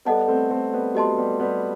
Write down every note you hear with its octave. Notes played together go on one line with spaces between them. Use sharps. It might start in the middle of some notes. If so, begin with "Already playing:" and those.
G3 B3 A4 D#5 F#5 A5
A3 C4
A3 C4
G3 B3
F#3 A3 G4 D#5 A5 C6
G3 B3
G3 B3